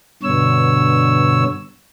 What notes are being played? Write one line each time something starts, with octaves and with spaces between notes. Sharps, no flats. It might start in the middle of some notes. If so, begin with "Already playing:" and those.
G2 B2 D3 C#5 E6